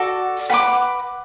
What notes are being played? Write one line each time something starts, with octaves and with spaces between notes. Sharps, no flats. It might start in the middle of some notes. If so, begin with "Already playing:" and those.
Already playing: F#4 A4 D5
B4 F#5 B5 D6